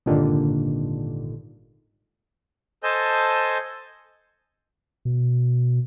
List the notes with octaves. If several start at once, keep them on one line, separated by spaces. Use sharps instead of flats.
G#1 G2 A#2 D3 D#3
A4 C5 D#5 G#5 A5 G6
B2